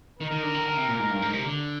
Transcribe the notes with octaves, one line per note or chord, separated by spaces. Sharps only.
D#3 A#4
D#3
D3
D#3
D3
C3
A#2
G#2
G2
G#2
C3
D3